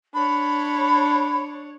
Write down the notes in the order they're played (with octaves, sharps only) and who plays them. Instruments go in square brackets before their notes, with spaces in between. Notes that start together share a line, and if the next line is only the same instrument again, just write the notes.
[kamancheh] D4 C#5 [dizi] B5